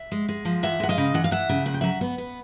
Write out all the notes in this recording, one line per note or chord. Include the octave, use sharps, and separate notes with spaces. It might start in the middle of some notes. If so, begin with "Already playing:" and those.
Already playing: E5 F#5
G#3
G#3
F3
E3 E5 F#5
G#3 F#5
D#5 F5
C#3
E3 F#5
F5
E3 E5 F#5
C#3
A#2 F#5
G5
F#3 E5 F#5
B3
B3